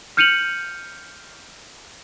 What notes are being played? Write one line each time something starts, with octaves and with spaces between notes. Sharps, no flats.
F6 G6 C#7 D#7 F7 F#7